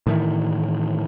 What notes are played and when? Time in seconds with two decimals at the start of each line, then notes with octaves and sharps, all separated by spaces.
0.07 A2 D#3 E3